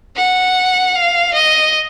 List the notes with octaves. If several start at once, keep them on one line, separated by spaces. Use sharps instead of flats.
F#5
F5
D#5